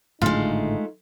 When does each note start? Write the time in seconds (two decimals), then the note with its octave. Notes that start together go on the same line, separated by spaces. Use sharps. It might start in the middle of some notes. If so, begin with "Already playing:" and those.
0.22 G#1 A2 D3 G#3 A3 D#4 F4 F5